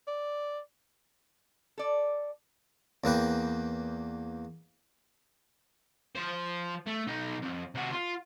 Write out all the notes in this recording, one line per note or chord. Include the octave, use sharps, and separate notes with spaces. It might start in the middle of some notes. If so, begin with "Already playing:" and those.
D5
A4 D5
E2 A#3 B4 G5
F3 C5
A3
B1 D#4
F2
C3 F#4
F4